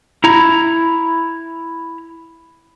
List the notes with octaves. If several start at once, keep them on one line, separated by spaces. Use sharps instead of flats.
E4 A#5